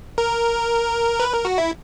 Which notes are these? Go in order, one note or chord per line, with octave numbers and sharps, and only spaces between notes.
A#4
B4
A#4
F#4
E4